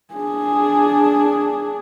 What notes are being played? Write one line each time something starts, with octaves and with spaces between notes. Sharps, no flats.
D4 G#4